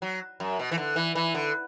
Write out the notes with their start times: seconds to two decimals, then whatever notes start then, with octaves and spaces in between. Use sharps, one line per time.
0.02 F#3
0.40 F#2
0.59 B2
0.72 E3
0.77 D3
0.96 E3
1.15 E3
1.34 D3